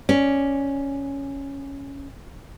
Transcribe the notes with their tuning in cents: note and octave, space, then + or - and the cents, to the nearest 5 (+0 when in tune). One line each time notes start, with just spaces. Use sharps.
C#4 +0 D5 +0